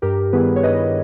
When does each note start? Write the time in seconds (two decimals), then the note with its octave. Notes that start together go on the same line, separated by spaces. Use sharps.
0.02 G2 G4 A#4
0.33 D#3 G3 B3 E4 G#4 B4
0.56 C#5
0.63 G2 B4 D#5